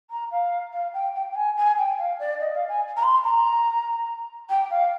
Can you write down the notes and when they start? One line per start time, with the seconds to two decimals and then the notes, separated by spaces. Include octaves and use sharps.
0.10 A#5
0.31 F5
0.73 F5
0.94 G5
1.15 G5
1.31 G5
1.36 G#5
1.57 G#5
1.78 G5
1.98 F5
2.20 D5
2.40 D#5
2.54 F5
2.68 G#5
2.97 A#5
3.03 C6
3.24 A#5
4.50 G5
4.70 F5